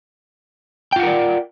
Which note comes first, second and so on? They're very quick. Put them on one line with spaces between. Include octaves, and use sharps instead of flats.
G5 F4 F#5 A#4 D5